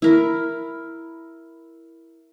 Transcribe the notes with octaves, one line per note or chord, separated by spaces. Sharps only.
E4 A#4